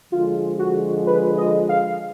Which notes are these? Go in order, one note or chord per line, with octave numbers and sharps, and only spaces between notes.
D3 F3 G#3 F4
F#4
B4
D#5
F5